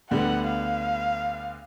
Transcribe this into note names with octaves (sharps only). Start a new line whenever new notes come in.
D2 D3 G3 B3 F#5
F5